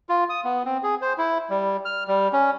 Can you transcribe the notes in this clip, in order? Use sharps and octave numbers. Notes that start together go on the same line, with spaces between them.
F4
D#6
B3
C4
G#4
C5
E4
G3
F6
G3
C#4